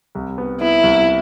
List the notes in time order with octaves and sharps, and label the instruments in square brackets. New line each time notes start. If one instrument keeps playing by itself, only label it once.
[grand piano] C2
B3
[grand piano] B3 [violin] E4
[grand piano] C2